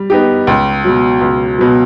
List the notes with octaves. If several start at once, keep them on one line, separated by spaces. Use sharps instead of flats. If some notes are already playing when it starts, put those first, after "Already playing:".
Already playing: G3
B3 D#4 G4
C#2
B2 F#3
C#2
B2 F#3